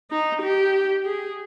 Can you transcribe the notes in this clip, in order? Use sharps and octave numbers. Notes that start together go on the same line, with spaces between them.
D#4
G4
G#4